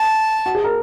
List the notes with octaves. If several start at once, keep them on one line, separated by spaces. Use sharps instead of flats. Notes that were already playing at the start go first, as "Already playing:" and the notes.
Already playing: A5
F#4
G#4
A#4